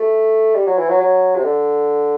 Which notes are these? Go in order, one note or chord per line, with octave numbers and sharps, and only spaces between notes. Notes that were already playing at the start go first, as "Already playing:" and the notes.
Already playing: A3
G3
F#3
E3
F#3
F#3
C3
D3